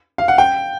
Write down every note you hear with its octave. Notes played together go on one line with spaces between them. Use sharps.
F5
F#5
G5